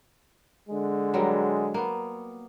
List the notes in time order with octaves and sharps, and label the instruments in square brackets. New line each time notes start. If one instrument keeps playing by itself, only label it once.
[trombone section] D3 G#3
[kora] F#3 G3 A#4
A#3 B3